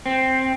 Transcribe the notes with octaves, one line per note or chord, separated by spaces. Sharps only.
C4